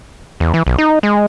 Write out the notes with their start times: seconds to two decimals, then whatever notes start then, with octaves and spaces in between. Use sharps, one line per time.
0.40 E2
0.54 E3
0.67 B1
0.78 D#4
1.03 G#3